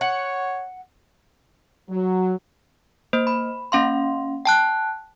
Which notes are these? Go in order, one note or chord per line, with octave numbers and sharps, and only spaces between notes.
C#5 F#5
F#3
A#3 C5
B5
A#3 C#4 F5 C6
G5 A5 F#6